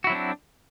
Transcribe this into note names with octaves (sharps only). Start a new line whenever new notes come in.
F#3 C4 D4 E4 F#4